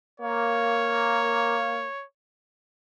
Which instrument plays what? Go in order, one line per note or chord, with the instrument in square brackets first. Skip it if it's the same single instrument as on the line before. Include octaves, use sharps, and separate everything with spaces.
[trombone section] A#3 [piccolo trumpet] C#5